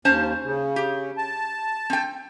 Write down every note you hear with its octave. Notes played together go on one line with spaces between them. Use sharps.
D#2 C#4 C5 A5
C#3
G4
A5
C4 G5